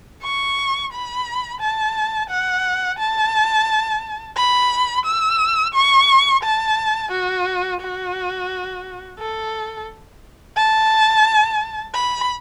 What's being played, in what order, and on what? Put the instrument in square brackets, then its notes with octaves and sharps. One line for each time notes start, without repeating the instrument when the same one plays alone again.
[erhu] C#6
B5
A5
F#5
A5
B5
E6
C#6
A5
F#4
F#4
A4
A5
B5